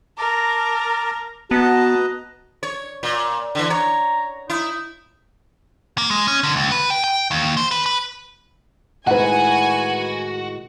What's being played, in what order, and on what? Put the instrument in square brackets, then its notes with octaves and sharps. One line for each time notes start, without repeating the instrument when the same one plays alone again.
[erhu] A#4 [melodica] A5 A#5 D6
[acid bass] B3 [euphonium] F#4 [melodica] B4 D#5 A#5 [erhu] A5
[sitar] C#5
A#2
D3 E3
[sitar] C#5 [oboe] A#5
[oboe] D#4 [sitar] E4
[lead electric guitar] A#3
G#3
C#4
D3
C#2
B4
G5
G5
D#2
C5
B4
B4
[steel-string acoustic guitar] A2 D#3 G#3 [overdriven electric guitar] F#4 [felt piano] B4 F#5 [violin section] G#5